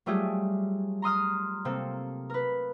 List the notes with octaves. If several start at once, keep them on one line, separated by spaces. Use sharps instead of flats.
F#3 G3 A3 F4 G4 G#4
A#5 C6 D#6 F6
C3 A#3 C4 A4
A#4 B4